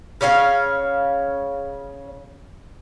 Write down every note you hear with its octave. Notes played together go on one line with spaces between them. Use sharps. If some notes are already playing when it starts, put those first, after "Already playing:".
C#3 C#4 C#5 F5